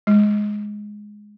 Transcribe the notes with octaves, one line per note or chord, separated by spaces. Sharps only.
G#3